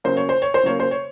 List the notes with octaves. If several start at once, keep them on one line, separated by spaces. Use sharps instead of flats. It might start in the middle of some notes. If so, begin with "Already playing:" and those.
C#3 F#3 A#3 C5
C#5
C5
C#5
C5
C#3 F#3 A#3 C#5
C5
C#5